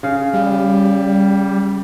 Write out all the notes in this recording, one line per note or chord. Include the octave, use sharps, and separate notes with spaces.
C#3 F5
G3